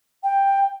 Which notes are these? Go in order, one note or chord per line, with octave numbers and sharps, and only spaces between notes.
G5